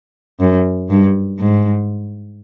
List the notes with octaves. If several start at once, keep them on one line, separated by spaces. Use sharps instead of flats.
F#2
G2
G#2